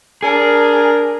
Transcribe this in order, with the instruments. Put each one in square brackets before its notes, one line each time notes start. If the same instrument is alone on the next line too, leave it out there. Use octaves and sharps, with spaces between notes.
[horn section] D4 A#4 A#5 [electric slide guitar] G#4